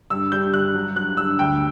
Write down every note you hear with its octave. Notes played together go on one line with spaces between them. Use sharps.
G2 E6
G3 G6
G2 F#6
F#3
F#3 F#6
G2 E6
D2 G5